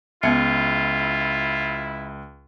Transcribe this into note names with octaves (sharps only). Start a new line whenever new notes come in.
C#2 B3 E4 F4 E5